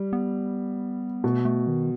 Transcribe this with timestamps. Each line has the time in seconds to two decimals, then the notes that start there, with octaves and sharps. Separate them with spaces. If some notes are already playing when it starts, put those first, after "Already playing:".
Already playing: G3
0.13 B3
1.23 B2 A3
1.45 A3
1.67 D#3